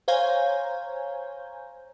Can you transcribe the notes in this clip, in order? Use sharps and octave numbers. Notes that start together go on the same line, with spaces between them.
C5 C#5 F5 G#5 A#5 G6